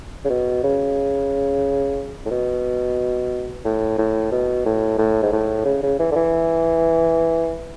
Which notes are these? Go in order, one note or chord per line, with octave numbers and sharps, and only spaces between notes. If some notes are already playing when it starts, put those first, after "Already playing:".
C#3
B2
C#3
A2
B2
A2
A2
B2
A2
A2
G#2
A2
C#3
C#3
E3
D3
E3